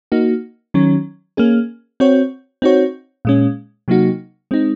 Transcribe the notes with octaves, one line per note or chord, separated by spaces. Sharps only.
A#3 D#4 F#4
D#3 F#3 C#4
A#3 C#4 G#4
C4 F#4 C#5
C4 D#4 F#4 C#5
A#2 G#3 C#4
C3 F#3 A#3 D#4 F#4
G#3 C4 D#4